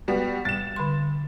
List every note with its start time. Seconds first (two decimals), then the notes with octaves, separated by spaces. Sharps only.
0.08 G3 B3 F#4
0.45 G3 A6 E7
0.76 D3 G3 C6